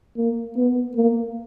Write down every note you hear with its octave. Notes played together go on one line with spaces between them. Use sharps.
A#3
B3
A#3